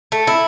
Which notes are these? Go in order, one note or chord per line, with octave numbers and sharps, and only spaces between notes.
A3
E4